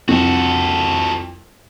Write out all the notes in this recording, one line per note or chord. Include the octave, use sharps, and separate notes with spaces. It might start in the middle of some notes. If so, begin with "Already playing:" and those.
C2 F2 F#4 A4